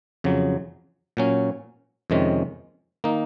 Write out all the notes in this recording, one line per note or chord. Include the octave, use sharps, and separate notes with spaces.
F2 C#3 F#3
A#2 F#3 C#4
F2 C3 D#3 G#3 C#4
D#3 A#3 D#4